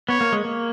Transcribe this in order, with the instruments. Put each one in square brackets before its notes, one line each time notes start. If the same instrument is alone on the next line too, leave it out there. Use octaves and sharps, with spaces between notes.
[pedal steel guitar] B3 [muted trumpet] C#5
[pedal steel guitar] A#3
G#3
A#3